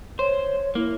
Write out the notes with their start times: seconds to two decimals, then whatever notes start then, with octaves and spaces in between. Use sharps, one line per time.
0.19 C5 C#5
0.75 A#3 E4